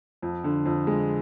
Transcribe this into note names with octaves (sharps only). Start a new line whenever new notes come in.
F2
D3
F2
G#3